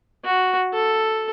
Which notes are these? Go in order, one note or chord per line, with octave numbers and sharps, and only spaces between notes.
F#4
A4